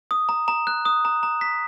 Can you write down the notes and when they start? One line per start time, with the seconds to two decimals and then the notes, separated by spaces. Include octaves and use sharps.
0.11 D#6
0.29 A#5
0.48 A#5
0.67 F#6
0.85 D#6
1.05 A#5
1.23 A#5
1.41 B6